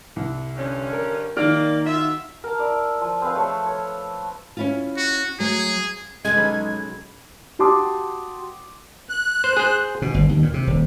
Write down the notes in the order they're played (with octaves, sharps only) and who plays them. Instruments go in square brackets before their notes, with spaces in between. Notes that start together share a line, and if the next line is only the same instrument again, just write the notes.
[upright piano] C2
[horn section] G2 D3 C#4
[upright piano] A#4
[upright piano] D#3 F6 D7 [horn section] A#3 D5
[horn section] F4 F#4 E5
[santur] A#4 A5
E4 D5
F3
C4 G#4 B4 F5
A3 A4 C#5
C#5
[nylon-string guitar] C#4 E4 F4
[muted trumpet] F#4
[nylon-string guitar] F#3 A3 [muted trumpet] G#4
[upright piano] G#3 [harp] G#4 A4 [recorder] G#6
[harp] B1 C#4 B5
[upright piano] F#4 G4 A5 C6 D6 D#6
[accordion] F#6
[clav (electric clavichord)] C5
G#4 C5
[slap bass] B2
G1
D#2
A#2
C3
D#1